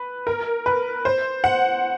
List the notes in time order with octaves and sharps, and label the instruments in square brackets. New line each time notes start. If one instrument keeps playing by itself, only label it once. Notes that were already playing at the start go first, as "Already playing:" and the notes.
Already playing: [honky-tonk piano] B4
A#4
B4
C5
F#5